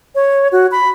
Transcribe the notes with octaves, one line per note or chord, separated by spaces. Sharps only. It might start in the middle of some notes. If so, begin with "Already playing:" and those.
C#5
F#4
B5